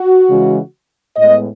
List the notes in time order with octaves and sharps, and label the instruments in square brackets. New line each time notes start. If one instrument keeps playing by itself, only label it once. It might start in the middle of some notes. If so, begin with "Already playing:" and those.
Already playing: [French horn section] F#4
C#3 E3 G#3
A2 G#3 B3 D#5